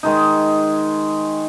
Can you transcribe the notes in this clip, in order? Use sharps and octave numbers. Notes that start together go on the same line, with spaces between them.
D#3 G#3 D#4